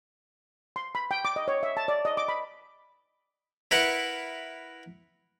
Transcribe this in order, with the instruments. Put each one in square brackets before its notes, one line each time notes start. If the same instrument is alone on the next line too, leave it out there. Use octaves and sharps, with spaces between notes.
[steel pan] C6
B5
G5
D6
D#5
C#5
E5
A5
D5
D#5
D6
B5
[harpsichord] E4 A#4 B4 F#5